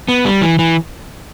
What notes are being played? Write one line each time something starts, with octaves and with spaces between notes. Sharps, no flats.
B3
G3
E3
E3